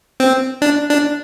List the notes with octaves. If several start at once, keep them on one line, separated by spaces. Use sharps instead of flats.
C4
D4
D4